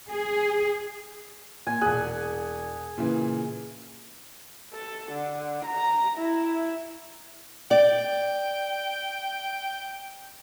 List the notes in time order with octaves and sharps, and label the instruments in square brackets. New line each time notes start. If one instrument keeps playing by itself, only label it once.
[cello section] G#4
[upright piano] A#2 [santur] G#5
[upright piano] E1 F#6 [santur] G#4
[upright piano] A#2 C#3 E3
[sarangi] A4
D3
A#5
E4
[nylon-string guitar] D5 [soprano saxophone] G5